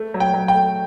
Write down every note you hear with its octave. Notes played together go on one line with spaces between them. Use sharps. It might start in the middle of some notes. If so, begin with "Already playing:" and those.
Already playing: A3
F#3
G5
F#3
G5
A3